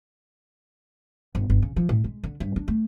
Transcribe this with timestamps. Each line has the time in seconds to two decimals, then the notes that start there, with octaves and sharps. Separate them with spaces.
1.35 G1
1.50 G1
1.62 C#3
1.76 F3
1.89 A2
2.04 G#3
2.24 D3
2.40 G2
2.56 D4
2.68 A3